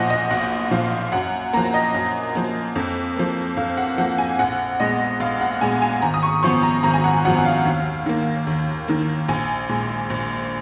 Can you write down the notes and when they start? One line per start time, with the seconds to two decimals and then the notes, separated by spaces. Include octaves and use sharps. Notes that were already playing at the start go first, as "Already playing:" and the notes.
Already playing: B1 A#2 F3 D#5 F#5 G#5
0.10 D#5
0.31 B1 F#5
0.71 A#2 F3 F5
1.12 F#2 F#5
1.53 F3 A#3 A#5
1.74 D#5
1.94 F#2
2.35 F3 A#3
2.76 F2
3.17 F3 A#3
3.57 F2 F5
3.78 F#5
3.98 F3 A#3 F#5
4.18 G#5
4.39 A#1 F#5
4.80 A#2 G#3 B3 D#5
5.20 A#1 F5
5.41 F#5
5.61 A#2 G#3 B3 G#5
5.82 G#5
6.02 G#1 A#5
6.14 D#6
6.23 C#6
6.43 F#2 F3 B3 C#6
6.63 A#5
6.83 G#1 A#5
6.94 G#5
7.04 F#5
7.25 F#2 F3 B3 F#5
7.45 F5
7.65 D#2
8.06 D#3 A#3
8.47 D#2
8.88 D#3 A#3
9.28 A#1 G#5
9.69 A#2 G#3
10.10 A#1